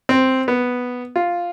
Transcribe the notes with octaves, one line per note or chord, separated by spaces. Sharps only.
C4
B3
F4